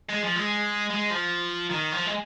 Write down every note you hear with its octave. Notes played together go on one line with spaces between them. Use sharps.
G#3
F3
G#3
G#3
F3
D#3
F3
G#3